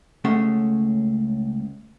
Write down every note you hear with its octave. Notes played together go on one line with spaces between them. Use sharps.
C#2 A3 C#4 G#4 F#5